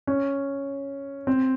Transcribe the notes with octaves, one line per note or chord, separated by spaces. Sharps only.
C#4
C4